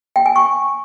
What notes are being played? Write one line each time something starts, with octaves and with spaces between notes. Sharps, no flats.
G5
G#5
C#6